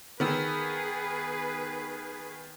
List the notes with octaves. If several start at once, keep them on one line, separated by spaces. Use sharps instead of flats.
D#3 B3 G#4 B4 E6